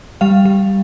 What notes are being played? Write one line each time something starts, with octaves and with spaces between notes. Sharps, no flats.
G3 F5
G3